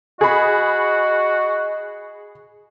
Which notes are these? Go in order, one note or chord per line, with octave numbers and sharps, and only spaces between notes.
F#4 G#4 D#5 B5